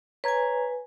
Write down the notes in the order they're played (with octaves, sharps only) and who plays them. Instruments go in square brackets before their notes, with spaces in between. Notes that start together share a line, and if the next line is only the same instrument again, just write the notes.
[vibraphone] B4 G#5 [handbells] C#5 A#5 G#6